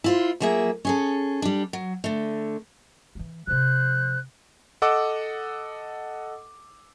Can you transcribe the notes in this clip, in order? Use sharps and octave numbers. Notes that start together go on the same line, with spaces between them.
E4 F4 C5
F3 F#3 A#3 G#4 E5
C#4 G#4 A4
G3 D4
F#3
D3 A3
E3 F#3
C3 F3 C5 F#6
A4 D#5 F#5 D6 E6